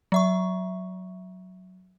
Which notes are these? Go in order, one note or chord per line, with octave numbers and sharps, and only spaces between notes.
F#3 E5 C#6